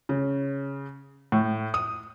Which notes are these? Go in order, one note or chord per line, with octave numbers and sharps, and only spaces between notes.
C#3
A2
D#6